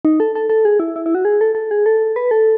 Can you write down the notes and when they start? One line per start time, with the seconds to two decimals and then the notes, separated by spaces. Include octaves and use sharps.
0.05 D#4
0.20 A4
0.35 A4
0.49 A4
0.65 G#4
0.80 E4
0.96 E4
1.06 E4
1.15 F#4
1.25 G#4
1.41 A4
1.55 A4
1.71 G#4
1.86 A4
2.16 B4
2.31 A4